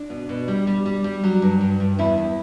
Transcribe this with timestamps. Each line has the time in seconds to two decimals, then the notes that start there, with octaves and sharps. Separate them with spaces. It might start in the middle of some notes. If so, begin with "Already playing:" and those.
Already playing: D4
0.10 B2
0.29 B2
0.48 G3
0.67 G3
0.86 G3
1.04 G3
1.24 F#3
1.42 G2
1.61 G2
1.80 G2
1.99 E2 E4
2.18 E2